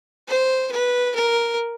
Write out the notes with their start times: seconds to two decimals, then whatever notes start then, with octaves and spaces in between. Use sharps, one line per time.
0.28 C5
0.72 B4
1.16 A#4